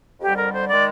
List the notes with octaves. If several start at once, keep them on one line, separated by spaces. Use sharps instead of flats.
F2 D3 G3 G4
A#4
C5
D#3 G#3 D5